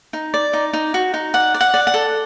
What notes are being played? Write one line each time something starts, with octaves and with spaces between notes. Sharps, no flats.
D#4
D5
D#4
D#4
F#4
D#4
D5 F#5
D5
F#5
D5
F#5
A4